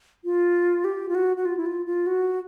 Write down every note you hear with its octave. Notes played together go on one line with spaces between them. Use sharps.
F4
G4
F4
F#4
F#4
F4
E4
F4
F4
F#4